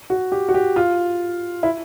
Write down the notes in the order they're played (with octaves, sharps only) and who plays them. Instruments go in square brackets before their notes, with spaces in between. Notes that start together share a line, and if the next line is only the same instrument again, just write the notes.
[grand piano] F#4
G4
F#4
G4
F4
E4